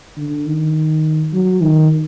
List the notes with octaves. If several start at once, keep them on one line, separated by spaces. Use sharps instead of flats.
D3
D#3
F#3
D#3